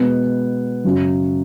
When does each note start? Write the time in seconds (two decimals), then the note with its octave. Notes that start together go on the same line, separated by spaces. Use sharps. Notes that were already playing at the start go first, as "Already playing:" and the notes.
Already playing: B2 G#3 B3
0.84 F#2 C#3 F#3